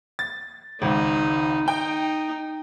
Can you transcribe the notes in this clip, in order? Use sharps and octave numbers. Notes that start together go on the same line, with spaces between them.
A6
G#1 C#2 D#4
D#4 G5